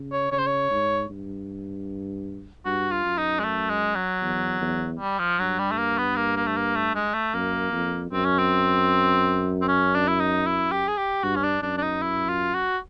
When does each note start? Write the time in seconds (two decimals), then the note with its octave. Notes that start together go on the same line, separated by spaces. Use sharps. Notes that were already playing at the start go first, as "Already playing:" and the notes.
Already playing: C#3
0.12 C#5
0.32 C#3 C#5
0.38 C5
0.46 C#5
0.71 G#2
1.10 G2
2.65 G2 F#4
2.91 F4
3.05 F#2
3.18 D#4
3.39 G#3
3.44 A3
3.70 G#3
3.95 F#3
4.22 E2
4.61 E2
4.99 G3
5.19 F3
5.39 G2 F#3
5.59 G3
5.71 A3
5.78 A#3
5.98 B3
6.16 A#3
6.36 A#3
6.47 A3
6.56 A#3
6.75 A3
6.95 G#3
7.14 A3
7.34 F#2 A#3
7.72 F2
8.12 F#2 C4
8.25 C#4
8.38 C4
9.62 C4
9.68 C#4
9.95 D4
10.08 E4
10.20 D#4
10.46 E4
10.72 G4
10.88 G#4
10.97 G4
11.24 G2 F#4
11.36 C#4
11.43 D4
11.62 F#2 D4
11.77 D4
11.82 D#4
12.02 E4
12.28 F4
12.54 F#4